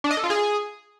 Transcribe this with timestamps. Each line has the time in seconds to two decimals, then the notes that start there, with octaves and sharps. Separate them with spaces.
0.04 D4
0.11 D#5
0.17 A4
0.24 F4
0.30 G#4